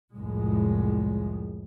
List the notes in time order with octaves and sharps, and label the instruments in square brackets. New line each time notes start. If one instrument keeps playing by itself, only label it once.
[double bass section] C2 F2 A2 G#3